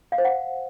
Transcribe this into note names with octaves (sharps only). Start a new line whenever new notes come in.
F5
C5
F#5